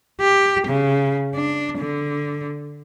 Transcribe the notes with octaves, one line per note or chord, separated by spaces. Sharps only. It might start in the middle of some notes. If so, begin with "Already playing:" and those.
G4
C#3
D4
D3